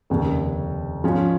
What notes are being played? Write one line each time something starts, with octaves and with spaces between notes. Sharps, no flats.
F1 D#2 C#3
G#2 F3 G#3 C#4